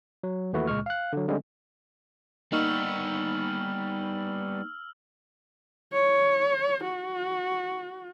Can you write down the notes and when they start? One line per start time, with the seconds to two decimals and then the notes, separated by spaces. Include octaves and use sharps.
0.24 F#3
0.53 D#2 E3 A3 F#4 B4
0.67 C#2 A#2 G#3 C#6 F6
0.86 F5 F#6
1.13 D3 F#3
1.28 D3 G3 G#3 C4 C#4
2.52 G3 A#3 B3 D#4 C#6 E6 F6 F#7
5.93 C#5
6.84 F#4